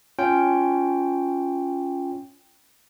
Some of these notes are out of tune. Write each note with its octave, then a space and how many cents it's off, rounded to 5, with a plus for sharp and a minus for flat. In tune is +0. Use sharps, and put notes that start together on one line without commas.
C#4 +10 F4 +0 G5 +0